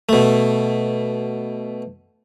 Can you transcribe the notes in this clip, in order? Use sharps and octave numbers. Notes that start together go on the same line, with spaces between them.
B2 A3